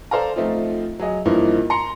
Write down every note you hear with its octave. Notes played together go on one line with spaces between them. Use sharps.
A4 C5 D5 F5 A#5
F3 A3 C4 D#4 F4
F#3 G#4 D#5
G2 E3 F3 A#3 D#4 E4
A#5 C6 C#7